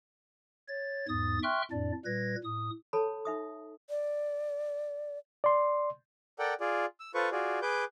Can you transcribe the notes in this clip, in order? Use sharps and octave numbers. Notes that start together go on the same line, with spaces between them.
C#5 A6
E2 G#2 D#6 A6
E5 G5 C6 C#6 F6 F#6
F2 A2 D4 D5
A#2 G3 B4 G#6 A#6
A2 D#6
A4 C#5 A5 B5
D#4 E5 D#6
D5
D5 C6
A4 A#4 D5 F#5 G5
F4 G#4 D5
E6
F4 A4 B4 C5 C#6
F4 F#4 G#4 D5
G#4 B4 D6 G6